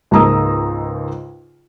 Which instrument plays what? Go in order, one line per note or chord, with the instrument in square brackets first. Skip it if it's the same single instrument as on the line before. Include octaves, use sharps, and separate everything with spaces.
[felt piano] C#2 G#2 A#3 A#5 D#6 E6